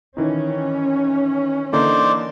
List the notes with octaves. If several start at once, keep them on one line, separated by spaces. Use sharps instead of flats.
D#3 E3 C#4 D#4
D3 E3 A#3 D#4 C5 D5